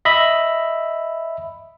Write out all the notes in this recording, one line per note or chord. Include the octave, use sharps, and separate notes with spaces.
D#5 E5 B5